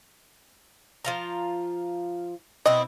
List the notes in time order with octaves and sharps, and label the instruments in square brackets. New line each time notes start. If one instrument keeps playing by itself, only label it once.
[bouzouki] F3 F4 A#5
[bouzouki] B2 C4 E4 [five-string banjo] D#5